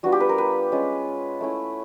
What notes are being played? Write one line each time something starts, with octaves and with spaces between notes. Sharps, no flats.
G3 B3 D4 F4 F#4
G4
B4
A#4
B4
G#3 C#4 F4
A3 C#4 E4